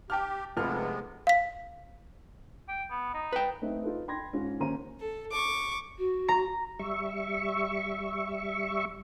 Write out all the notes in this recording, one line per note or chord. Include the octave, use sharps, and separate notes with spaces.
G4 G5 A5 F6
F1 F2 C3 G#3 B3 F6
F5 B6
G5
B3
D#4
B4 G5
A3 C4 D#4 B4
D#4 F4 A4 B4
G5 B5 C6 G#6 A#6
G#2 C#4 F4
D#2 A#3 C#4 C5 A#5 D#7
A4
C#6 D6
F#4
A#5
G3 E5 C#6